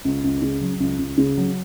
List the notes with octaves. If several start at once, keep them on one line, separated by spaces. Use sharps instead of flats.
C#2
C#2
C#3
F#3
C#2
C#2
C#3
F#3